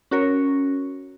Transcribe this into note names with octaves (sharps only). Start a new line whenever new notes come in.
C#4 F#4 A#4 C#5